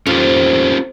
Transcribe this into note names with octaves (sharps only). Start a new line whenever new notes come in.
F2 C#4 F4 G4